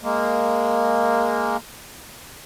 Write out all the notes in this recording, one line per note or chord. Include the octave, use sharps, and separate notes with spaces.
G#3 A#3